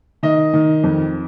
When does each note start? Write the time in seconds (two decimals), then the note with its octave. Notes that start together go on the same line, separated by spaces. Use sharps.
0.23 D#3 D#5
0.53 D#3
0.84 F2